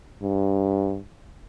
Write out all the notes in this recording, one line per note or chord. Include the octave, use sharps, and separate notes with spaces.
G2